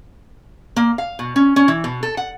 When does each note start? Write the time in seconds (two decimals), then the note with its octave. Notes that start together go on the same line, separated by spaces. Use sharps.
0.76 A#3
0.98 F5
1.19 B2
1.36 C#4
1.56 C#4
1.68 E3
1.84 B2
2.03 A4
2.17 F#5